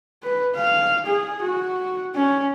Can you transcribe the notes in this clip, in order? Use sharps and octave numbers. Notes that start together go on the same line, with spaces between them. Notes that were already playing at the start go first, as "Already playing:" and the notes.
B4
F5
G#4
F#4
C#4